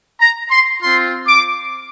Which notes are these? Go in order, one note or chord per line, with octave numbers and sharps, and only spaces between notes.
A#5
C6
C4 F4 C6
D6